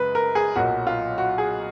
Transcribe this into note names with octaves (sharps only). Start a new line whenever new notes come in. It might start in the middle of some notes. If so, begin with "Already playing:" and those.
Already playing: F#2 C#3 G#3 B4
A#4
G#4
B1 A#2 F#3 F#4
F4
F#4
G#4